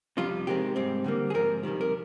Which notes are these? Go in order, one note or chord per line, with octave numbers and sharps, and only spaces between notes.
F2 C3 G3 F4
C3 D#3 G#3 C4 G4
G#2 G3 C4
D3 G3 A#3
G#4
G#2 F3 C4 A#4
F2 C3 D#3 G3
A#4